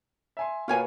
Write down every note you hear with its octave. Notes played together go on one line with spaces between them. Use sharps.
E5 G#5 C6
B2 A#3 B3 F4 C#5 G#5